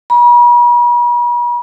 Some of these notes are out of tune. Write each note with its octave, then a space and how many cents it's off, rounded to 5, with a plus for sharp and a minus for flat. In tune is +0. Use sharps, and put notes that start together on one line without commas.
B5 -45